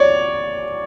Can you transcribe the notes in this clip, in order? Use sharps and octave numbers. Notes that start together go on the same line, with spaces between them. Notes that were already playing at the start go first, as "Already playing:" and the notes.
Already playing: C#5 D5